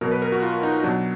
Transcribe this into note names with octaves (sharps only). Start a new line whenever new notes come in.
B2 F#3 A#4
B4
A#4
F#4
F4
D#4
B2 F#3 D4